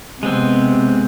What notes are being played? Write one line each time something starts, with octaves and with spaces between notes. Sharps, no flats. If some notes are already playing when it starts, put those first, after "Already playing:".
C3 G#3 B3 C4